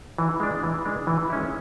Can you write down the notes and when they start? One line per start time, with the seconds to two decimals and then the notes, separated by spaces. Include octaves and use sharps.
0.18 E3
0.40 G#3 D4
0.63 E3
0.85 G#3 D4
1.07 E3
1.30 G#3 C#4 E4